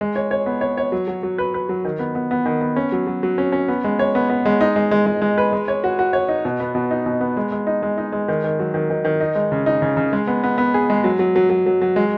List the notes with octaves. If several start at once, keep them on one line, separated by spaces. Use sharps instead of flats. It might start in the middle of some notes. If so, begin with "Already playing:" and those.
G#3
C#5
C#5
B3
C#5
C#5
F#3
F#3
F#3
B4
B4
F#3
D#3
B3
B3
B3
D#3
B3
C#4
F#3
F#3
F#3
C#4
C#4
B3
G#3
C#5
B3
B3
G#3
D#4
G#3
G#3
G#3
G#3
B4
G#3
C#5
F#4
F#4
C#5
D#4
B2
B3
B2
D#4
B2
B3
G#3
G#3
D#4
G#3
D#4
G#3
D#3
D#3
F#3
D#3
D#3
D#3
D#4
G#3
C#3
D#4
C#3
C#3
G#3
B3
B3
B3
G#4
G#3
F#3
F#3
F#3
F#3
F#3
F#3
G#3